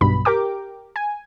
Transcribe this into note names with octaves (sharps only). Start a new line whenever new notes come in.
B1 G2 B5
G4 A#4 G5 D6
G#5